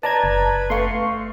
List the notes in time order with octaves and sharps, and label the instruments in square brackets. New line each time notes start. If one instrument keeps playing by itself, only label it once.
[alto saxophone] B4 [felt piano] D5 [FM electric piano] A5 A#5 G#6
[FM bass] F#1
[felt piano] A3 F5 [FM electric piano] C6 C#6